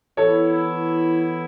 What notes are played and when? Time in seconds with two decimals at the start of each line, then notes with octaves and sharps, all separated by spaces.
0.17 E3 B3 E4 A4 C#5